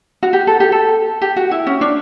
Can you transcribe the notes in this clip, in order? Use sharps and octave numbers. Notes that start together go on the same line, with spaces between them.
F#4
G4
A4
G4
A4
G4
F#4
E4
C#4
D4